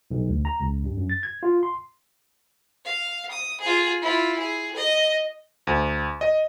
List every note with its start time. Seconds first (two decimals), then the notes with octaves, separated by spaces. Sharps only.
0.11 B1
0.28 D2
0.45 A#5
0.60 C#2
0.84 G2
0.97 F#2
1.10 A6
1.23 G#6
1.43 F4
1.63 C6
2.85 F5
3.31 D#6
3.61 F4 G#4
4.02 E4 F4
4.39 G#4
4.76 D#5
5.67 D2
6.21 D#5